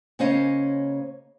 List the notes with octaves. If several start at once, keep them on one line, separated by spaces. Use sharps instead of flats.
C#3 A#3 C#4 C5 D#5 F5